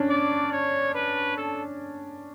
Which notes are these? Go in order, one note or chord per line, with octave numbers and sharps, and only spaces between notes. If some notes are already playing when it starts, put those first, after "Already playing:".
Already playing: C#4 D4
D5
C#5
B4
A4